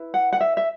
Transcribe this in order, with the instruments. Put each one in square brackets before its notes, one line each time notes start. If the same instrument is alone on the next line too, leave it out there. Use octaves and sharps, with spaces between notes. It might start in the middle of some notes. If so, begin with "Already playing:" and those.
Already playing: [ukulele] E4 B4
F#5
F#5
E5
E5